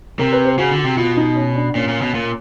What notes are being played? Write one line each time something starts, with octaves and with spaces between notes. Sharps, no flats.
C3 A#4
B4
C5
C#3 F#4
D3
F#4
C3
B2 F4
D#4
C#4
D4
A#2 C#4
A#2
B2
A#2